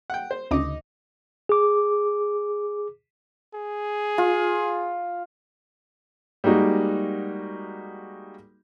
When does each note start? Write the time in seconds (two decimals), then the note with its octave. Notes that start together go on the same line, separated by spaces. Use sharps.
0.10 F#5 G5
0.31 C5
0.51 D2 C#3 D#4 D#5 D6
1.49 G#4 D6
3.54 G#4
4.18 F4
6.44 G3 G#3 A#3 D#4 F#4